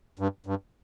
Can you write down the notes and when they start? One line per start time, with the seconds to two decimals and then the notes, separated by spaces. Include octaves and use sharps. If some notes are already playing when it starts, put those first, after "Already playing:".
0.19 G2
0.46 G2